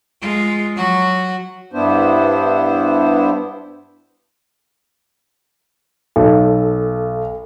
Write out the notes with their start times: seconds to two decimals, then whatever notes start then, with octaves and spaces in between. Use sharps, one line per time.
0.22 G#3 F4
0.77 F#3 F#4
1.73 G2 B3 D4 E4 C5
6.16 B1 A4